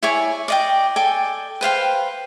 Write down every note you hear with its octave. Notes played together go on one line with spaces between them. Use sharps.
E4 C#5 D5 G#5
D5 D#5 G5
A4 D5 G5 G#5
B4 C5 F5 G5